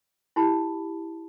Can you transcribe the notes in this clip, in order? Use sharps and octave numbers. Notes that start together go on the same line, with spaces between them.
E4 F#4 G4 A5 B5